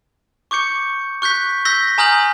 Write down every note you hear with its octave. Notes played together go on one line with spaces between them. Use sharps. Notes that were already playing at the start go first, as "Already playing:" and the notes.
C#6 D6 G6 C#7
C#6 F#6 G6 B6
E6 G6 A#6 B6 G7
G#5 A#5 D#6 F6 G6 F#7